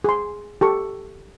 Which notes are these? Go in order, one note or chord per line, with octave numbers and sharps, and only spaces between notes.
G#4 C6
G4 A4 C#6